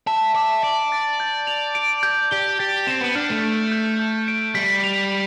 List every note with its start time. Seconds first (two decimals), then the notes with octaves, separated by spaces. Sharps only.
0.07 E5 A5
0.35 E5 D6
0.63 D5 A5
0.92 A6
1.20 G6
1.47 F7
1.75 D7
2.03 G6
2.31 G4 G7
2.59 G4 A6
2.87 C4 E7
3.01 B3
3.15 D4 F6
3.30 A3
3.43 D7
3.72 G6
3.99 G6
4.28 D7
4.55 G3 B6
4.84 F7